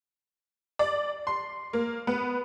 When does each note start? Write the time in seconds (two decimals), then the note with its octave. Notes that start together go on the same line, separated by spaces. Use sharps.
0.79 D5
1.27 C6
1.73 A#3
2.07 B3